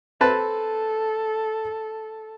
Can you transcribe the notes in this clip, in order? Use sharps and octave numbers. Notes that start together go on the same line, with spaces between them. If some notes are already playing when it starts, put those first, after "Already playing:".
C4 A4 B4 A5